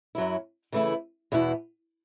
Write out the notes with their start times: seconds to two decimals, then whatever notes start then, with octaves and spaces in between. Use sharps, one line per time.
0.15 F#2 F#3 C#4 E4
0.72 C#3 E3 A3 E4
1.32 E2 B2 B3 E4